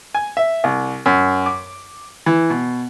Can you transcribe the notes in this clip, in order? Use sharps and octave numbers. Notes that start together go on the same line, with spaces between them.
G#5
E5
C2
F#2
D6
E3
B2